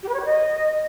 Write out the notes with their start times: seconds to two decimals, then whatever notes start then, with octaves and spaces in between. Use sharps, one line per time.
0.03 G4
0.09 B4
0.14 C#5
0.20 G4
0.25 D#5